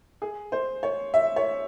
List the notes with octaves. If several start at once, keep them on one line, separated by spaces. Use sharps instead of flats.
G#4
C5
C#5
E5
C#5